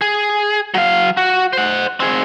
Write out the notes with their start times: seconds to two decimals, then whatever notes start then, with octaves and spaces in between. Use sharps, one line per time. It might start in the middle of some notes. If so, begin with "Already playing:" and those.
0.01 G#4
0.74 F#3 F5
1.17 F#4
1.53 C5 F#5
2.00 C4 G#4